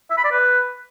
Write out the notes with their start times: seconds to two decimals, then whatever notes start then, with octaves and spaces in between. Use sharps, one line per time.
0.10 E5
0.17 B5
0.24 D5
0.31 B4